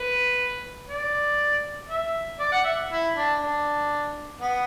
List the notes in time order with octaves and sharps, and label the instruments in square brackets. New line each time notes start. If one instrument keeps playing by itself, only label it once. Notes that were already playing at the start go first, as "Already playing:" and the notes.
Already playing: [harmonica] B4
D5
E5
D5
F#5
E5
E4
D4
D4
B3